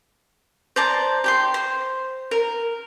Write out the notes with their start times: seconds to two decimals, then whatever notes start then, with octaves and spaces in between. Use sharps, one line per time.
0.76 C5 D5 A5 A#5
1.24 G4 G5 C6
1.54 C5
2.31 A#4